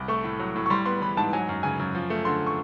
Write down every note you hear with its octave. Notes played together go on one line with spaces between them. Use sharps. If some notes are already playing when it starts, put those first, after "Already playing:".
Already playing: C2
A3 C#6
A2
F#3
A2
C#6
G3 C6
B3 C6
E3 B5
G#2 A5
F#3 G#5
F#2
C#3 G#5
F#2
F3
A3
D3 C6
C#6